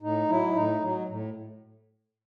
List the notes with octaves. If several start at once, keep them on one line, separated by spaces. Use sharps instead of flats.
A2 D#4
F#3 E4
A2 D#4
F#3
A2